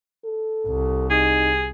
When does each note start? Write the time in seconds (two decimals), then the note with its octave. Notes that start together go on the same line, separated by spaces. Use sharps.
0.25 A4
0.67 C2
1.10 D#4 G#4